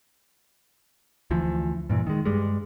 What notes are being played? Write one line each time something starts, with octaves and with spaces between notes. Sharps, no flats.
D2 E3 F3
G2 A#2 E3
D#3 G#3
G2 G3 G#3